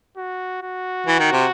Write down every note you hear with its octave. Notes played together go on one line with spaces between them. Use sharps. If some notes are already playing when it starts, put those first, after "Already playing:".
F#4
F#4
E3
D#3
C3